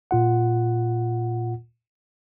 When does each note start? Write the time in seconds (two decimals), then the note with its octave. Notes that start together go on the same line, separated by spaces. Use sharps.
0.11 A#2 F4 F#5